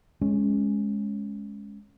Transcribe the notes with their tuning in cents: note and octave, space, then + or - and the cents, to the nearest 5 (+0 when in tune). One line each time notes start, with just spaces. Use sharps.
G#3 +0 C#4 +0